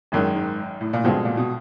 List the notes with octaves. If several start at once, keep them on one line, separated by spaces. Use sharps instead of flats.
G#1 F#2 D#3 G#3
G#2
A2
A#2
G2 B2 D3 F3 G#3 C4
A#2
B2